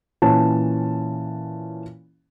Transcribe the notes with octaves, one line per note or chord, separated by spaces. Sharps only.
A#2 E3 C#4 C#5 A5